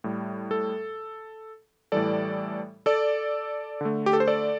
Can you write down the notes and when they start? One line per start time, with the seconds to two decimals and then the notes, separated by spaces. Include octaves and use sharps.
0.04 A2 G3
0.51 A4
1.92 A2 E3 G3 A4 D5
2.86 A4 D5
3.81 D3 A3
4.06 G4
4.13 A4
4.20 C5
4.27 A4 D5